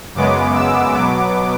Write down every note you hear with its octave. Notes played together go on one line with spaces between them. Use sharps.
F#2 C#3 G#3 B3 D6
E6
B2 F#3 B3 D6